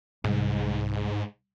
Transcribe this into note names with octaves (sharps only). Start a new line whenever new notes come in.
C2 G#2